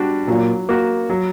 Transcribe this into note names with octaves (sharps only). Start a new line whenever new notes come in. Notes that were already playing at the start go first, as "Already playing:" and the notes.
Already playing: G3 D4 F#4
A#2 F#3
A#3 F#4
F#3